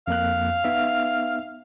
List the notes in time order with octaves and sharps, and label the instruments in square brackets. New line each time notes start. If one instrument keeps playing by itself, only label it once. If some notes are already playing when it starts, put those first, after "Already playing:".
[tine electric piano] F2 A#3 F#6 [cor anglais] F5
[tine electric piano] B3 D#4 E5